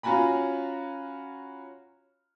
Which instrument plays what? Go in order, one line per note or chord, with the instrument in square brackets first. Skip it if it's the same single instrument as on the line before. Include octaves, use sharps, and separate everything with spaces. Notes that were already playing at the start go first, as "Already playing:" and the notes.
[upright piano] C#4 F4 F#4 G#5 A#5 B5